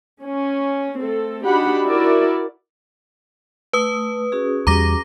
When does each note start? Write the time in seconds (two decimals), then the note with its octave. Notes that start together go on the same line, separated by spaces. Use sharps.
0.23 C#4
1.00 A3 C4 A4
1.45 D4 D#4 F#4 G4 F#5 B5
1.87 E4 F#4 A#4 D5
3.73 A3 B4 D#6
4.32 C#4 F#4 G#4
4.67 E2 G3 A#5 D6 A#6